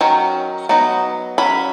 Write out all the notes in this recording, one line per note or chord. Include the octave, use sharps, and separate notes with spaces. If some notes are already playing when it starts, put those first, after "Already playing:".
D#3 F#3 C#4
F#3 B3 D#4
F#3 C#4 B5